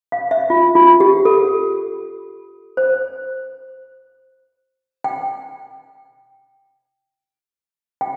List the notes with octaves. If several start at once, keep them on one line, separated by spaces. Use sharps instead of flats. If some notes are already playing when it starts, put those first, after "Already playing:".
F5
E5
F4
F4
G4
A4
C5
G5
G5